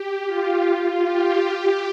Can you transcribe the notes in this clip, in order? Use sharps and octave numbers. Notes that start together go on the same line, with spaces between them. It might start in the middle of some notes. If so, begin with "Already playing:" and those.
Already playing: G4
F4
F4
G4
G4